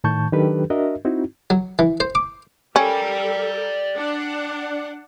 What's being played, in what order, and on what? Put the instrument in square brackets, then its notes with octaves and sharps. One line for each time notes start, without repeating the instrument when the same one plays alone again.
[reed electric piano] A2 D#3 A5 C#6 G6
D#3 F#3 D4 G4 A4 B4
D4 F#4 A#4 D#5 E5
C4 D#4 E4 F#4
[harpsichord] F#3
E3
C5
D6
[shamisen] C#4 [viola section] G4 A4 A#4 [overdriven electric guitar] D5 G5
[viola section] D4 F#5